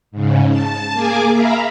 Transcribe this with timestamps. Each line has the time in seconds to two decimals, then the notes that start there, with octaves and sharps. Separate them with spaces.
0.12 G#2 C#3
0.50 A5
0.93 A#3 G#4 G#5 D6
1.31 E5 F5 A#5 B5